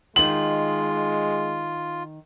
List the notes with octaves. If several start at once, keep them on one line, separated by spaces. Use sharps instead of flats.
D#3 G#3 D#4 F4 F#7